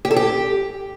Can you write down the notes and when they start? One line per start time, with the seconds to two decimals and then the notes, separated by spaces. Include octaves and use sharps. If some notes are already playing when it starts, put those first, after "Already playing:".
0.05 G4
0.11 A4
0.16 G4